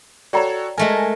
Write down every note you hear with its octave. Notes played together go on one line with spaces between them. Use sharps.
F#4 A4 C#5 D5 G5 A#5
G#3 A3 A#4 G#5